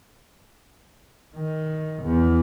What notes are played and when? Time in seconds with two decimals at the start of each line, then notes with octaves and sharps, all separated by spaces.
1.36 D#3
2.03 E2